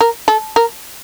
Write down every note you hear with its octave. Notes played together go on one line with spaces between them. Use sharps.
A#4
A4
A#4